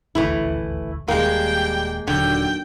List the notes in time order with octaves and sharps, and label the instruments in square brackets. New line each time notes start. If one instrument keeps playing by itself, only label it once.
[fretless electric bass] D#1 A1 D2 [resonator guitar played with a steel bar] E3 A3 E4
[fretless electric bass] D#1 D#2 [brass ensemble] G3 [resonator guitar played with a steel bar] G#3 A#3 [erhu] G5
[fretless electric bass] D#1 [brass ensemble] D#2 F#3 [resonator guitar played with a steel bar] D3 [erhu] G5